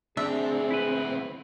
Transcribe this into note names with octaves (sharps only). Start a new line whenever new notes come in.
D2 C4 D4 G#4 E5
E4 B4